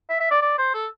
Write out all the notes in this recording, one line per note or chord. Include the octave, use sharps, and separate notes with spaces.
E5
E5
D5
D5
C5
A4